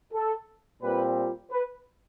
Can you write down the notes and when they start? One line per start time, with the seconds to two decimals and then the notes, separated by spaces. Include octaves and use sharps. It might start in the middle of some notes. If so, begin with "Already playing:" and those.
0.13 A4
0.82 A#2 G3 C4 F4 B4
1.51 B4